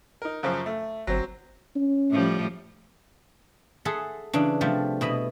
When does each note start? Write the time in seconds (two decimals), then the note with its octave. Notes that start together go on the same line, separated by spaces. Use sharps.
0.22 D#4 A#4
0.43 F#2 C#3 F3
0.66 A3
1.07 G1 F#3 C4
1.76 C#4
2.10 A2 F3 G3
3.85 G#4 A4 E5 F#5 A5 C6
4.33 C#3 E3 D4
4.61 C3 F3 G3 A3
5.01 B2 E4 D#5 B5